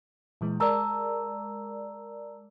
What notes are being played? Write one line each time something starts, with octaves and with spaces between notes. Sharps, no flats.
A#2 E3 G#3
G#3 A#4 D5 A5 A#5 E6